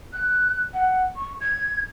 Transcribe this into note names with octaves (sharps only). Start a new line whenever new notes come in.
F#6
F#5
C#6
G#6